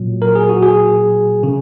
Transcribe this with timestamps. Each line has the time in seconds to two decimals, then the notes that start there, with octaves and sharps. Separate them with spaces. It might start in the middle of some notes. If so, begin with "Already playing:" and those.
Already playing: A#2 F#3
0.22 A#4
0.35 G#4
0.49 F#4
0.62 G#4
1.43 C#3